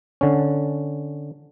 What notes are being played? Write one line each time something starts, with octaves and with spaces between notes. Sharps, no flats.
D3 C#4